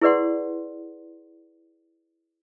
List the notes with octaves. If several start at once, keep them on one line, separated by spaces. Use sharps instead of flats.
E4 G#4 B4 D5 F#5 C6